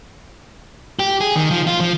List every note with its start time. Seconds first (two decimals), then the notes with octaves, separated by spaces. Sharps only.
0.99 G4
1.21 G#4
1.36 D#3
1.51 F3
1.67 F4
1.80 F3